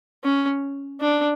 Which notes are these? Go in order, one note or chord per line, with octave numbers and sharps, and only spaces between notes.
C#4
D4